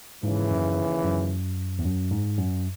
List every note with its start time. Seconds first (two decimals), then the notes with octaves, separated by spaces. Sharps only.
0.23 D#2 G#2 C#3 E3
0.51 F#2
1.05 F#2
1.79 E2
1.85 F#2
2.11 G#2
2.39 F#2